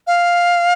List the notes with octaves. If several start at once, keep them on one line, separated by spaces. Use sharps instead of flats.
F5